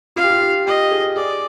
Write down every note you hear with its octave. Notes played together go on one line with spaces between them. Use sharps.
F4 F5
G4
F4
G4
G4 D#5
G#4
G#4 D5